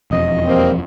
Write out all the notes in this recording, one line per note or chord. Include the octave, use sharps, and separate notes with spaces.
E1 F2 D#5
G3 A#3 C4